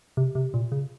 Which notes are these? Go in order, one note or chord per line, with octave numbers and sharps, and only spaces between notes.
C3
C3
A#2
C#3